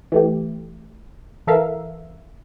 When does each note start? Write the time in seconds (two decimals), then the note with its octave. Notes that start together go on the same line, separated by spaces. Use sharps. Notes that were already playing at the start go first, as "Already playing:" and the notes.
0.12 E3 A3 G4
1.47 E3 A4 A#4 E5 F5